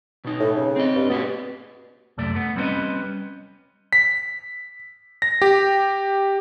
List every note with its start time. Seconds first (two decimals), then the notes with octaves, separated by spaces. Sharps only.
0.25 B2 D#4
0.40 A2
0.56 C#3
0.76 C4 D#5
0.96 G2
1.10 B2 B3 G4 G#4
2.18 C2 F#2 A3 D5
2.35 A3 B3
2.56 G3 C4 C#4 F#4 B4 D#5
3.93 B6
5.22 A#6
5.42 G4